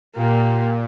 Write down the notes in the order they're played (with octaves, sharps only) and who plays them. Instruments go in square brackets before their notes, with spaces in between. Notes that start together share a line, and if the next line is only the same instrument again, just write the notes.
[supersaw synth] A#2 [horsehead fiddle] A#3 G4